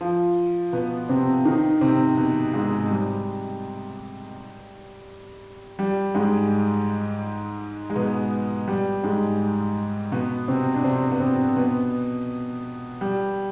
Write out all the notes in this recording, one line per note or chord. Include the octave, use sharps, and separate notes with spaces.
F3
B2 B3
C3 C4
D#3 D#4
C3 C4
B2 B3
G#2 G#3
G3
G3
G#2 G#3
G#3
B2 B3
G3
G#2 G#3
B2 B3
C3 C4
D4
C3 C4
B3
C3 C4
B2 B3
G3